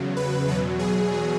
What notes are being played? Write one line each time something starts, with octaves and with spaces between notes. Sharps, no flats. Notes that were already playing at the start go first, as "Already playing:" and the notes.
Already playing: E2 C#3 F#3
B4
E2 B2 F#3 B4
G#4